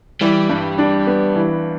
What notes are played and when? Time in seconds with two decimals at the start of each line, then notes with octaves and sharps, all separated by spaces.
0.21 E3 G3
0.49 G2
0.78 D4
1.07 B3
1.35 E3